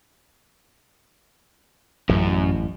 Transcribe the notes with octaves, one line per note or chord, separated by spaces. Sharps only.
A1 F#2